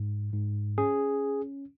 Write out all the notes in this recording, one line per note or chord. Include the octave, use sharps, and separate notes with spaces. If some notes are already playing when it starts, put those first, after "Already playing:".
Already playing: G#2
G#2
C#4 G#4